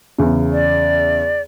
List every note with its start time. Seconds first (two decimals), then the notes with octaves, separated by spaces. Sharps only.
0.18 E2 C#3
0.52 D5